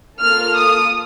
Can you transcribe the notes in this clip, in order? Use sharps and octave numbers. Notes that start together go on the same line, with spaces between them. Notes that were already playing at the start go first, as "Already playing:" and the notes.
A#3 F4 A4 F6
D#6